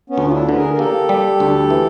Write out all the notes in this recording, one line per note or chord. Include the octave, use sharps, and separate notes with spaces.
B3 C#4
D2
F4
D4 E4
D3 B4
G#4 A#4
A#4
A#3 G4 A4
G3
D2
E3